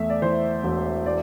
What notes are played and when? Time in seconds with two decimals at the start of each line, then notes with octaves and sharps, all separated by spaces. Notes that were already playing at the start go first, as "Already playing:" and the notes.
Already playing: E2 A3 E5
0.10 D5
0.22 E3 C5
0.63 E1
1.06 D5